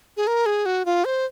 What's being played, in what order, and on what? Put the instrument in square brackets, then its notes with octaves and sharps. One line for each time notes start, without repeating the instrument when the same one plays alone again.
[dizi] G#4
A#4
G#4
F#4
F4
C5